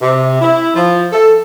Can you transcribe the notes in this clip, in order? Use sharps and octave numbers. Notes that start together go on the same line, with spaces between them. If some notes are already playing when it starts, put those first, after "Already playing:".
C3
E4
F3
A4